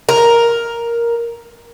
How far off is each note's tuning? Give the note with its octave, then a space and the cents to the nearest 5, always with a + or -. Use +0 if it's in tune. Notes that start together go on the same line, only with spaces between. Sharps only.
A#4 +5